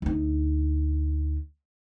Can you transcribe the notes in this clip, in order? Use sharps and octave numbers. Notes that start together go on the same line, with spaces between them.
D2 D#4